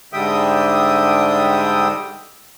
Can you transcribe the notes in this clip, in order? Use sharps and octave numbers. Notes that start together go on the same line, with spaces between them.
G#2 D3 G3 E5 G5 D#6